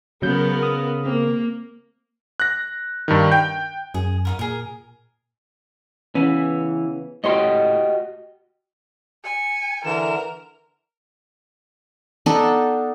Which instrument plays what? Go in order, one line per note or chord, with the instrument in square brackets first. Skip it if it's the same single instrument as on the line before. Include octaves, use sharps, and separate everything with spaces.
[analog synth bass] C#3 [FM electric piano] F#3 G6 [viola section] B3 A#4
[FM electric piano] D#6
[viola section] A#3 [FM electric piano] C4
[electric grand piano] F#6 A#6
G2 D#3
G5 G6
[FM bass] F#2 [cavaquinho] G#4
[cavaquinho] D#4 F4 A#4
[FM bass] A#2 [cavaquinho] G#4 A#4
[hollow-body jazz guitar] C#3 B3 C#4 [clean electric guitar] E3
[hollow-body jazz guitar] A2 C#5 C6 [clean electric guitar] F#4 G4 D#5
[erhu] G#5 [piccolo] C#7
[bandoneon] D3 E3 [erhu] A#4 [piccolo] E7
[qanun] B3 D4 D#4 A4